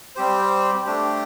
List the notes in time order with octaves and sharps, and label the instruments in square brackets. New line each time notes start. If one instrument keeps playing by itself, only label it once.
[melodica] G3 C4 G4 C5
A3 D4 G4